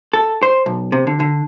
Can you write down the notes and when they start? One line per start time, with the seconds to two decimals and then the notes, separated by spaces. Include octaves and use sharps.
0.13 A4
0.43 C5
0.66 B1
0.92 C3
1.07 D3
1.20 D3